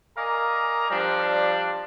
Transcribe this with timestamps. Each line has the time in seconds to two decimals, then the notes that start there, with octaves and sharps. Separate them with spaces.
0.17 A#4 D5 D#5 F5 G#5 A#5
0.90 F3 G3 D4